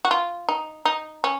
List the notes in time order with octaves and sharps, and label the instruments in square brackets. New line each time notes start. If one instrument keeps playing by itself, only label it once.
[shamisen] F#4
F4
D#4
D#4
C#4